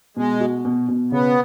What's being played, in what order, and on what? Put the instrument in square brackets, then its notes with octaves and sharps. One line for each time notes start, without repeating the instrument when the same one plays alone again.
[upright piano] B2 [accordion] G#3
[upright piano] F#4
B2
B2
[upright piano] C#3 [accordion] B3